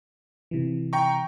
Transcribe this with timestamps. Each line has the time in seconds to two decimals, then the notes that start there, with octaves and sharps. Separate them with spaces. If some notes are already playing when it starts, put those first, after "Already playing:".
0.51 C3 E3
0.93 G5 A#5 C#6